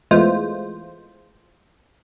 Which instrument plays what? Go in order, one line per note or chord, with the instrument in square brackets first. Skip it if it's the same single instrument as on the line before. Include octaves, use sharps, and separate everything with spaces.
[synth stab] E2 E3 G#3 A3 F4 C5